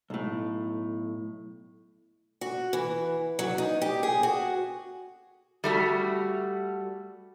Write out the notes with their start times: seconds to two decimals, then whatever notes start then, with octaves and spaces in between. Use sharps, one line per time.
0.10 B1 A2
2.41 F#4
2.73 E3
3.39 F#3
3.58 D#4
3.82 G4
4.03 G#4
4.23 F#4
5.64 G3 A3 F#4